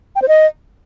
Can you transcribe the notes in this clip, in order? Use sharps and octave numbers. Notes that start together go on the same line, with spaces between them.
G5
C5
D#5